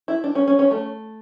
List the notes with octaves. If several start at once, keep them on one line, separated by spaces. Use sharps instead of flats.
E4
D4
C#4
C#4
C#4
A3